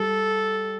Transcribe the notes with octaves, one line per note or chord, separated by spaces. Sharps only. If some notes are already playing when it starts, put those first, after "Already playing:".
Already playing: G3 A4